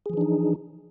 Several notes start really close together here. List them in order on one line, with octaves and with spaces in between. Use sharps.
G#4 F3 E3 D4 D#4